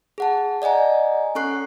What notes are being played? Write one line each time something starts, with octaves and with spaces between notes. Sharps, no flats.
G#4 F#5 A5
D5 D#5 F#5 G#5 A#5
C#4 A4 C#6 F#6 C7